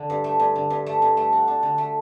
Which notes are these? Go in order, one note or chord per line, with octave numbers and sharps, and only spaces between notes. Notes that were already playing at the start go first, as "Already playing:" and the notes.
Already playing: D3
G2
A3
G2
D3
G2
A3
G2
A3
F#4
D4
D3
A3